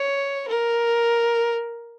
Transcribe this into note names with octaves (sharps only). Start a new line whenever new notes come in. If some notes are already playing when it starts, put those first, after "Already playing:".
Already playing: C#5
A#4